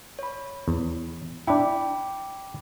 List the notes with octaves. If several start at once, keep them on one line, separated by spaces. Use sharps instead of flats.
C#5 B5
E2
D4 E4 G5 B5 D6